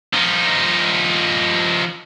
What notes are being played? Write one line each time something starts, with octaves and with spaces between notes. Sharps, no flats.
F3 D#4